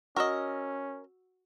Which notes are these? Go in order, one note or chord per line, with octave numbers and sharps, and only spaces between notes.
C#4 F#4 A#4 D#5 E6